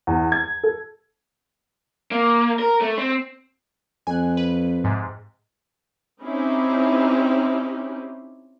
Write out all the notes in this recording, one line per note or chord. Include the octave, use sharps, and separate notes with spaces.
E2
G#6
A4
A#3
A#4
A3
C4
F2 G#5 F#6
B4
G#2 C3
C4 C#4 D#4 E4 G4